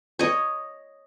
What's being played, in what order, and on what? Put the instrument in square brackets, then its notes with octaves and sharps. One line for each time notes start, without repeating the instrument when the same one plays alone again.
[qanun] C#5 D#5